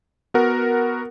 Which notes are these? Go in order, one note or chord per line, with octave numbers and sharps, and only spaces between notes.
B3 F#4 A#4 F#5